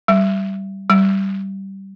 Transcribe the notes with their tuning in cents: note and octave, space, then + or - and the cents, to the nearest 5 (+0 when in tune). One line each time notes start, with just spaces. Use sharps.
G3 -15
G3 -15